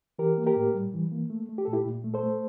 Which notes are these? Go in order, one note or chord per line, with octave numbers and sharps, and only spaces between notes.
E3 G4 A#4
A#3
G4 A#4
A2
G3
E3
A#3
A3
A3
G4
A#2 A4
E4 G4
A#2
A3
A4 C5
A3